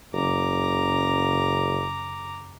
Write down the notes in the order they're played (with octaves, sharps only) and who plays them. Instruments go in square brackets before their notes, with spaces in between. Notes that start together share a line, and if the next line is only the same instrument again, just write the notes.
[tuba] F#1 [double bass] F#2 C#3 [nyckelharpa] A#5 D6